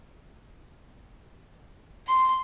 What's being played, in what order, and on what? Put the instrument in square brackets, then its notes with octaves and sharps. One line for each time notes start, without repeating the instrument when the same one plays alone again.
[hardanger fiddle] C6